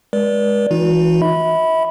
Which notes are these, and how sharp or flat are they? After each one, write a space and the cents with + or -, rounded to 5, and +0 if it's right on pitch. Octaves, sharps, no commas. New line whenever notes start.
G#3 +0 B4 -40 D5 -20
E3 +0 D#4 +20 F#4 -40
E5 -35 B5 +0